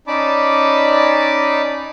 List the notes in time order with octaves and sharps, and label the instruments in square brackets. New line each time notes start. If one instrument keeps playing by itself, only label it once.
[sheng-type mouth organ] C#4 D#4 D5 A5 B5 D6